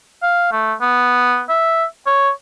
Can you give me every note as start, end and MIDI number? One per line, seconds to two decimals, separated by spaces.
0.23 0.52 77
0.52 0.74 57
0.81 1.42 59
1.49 1.85 76
2.07 2.30 73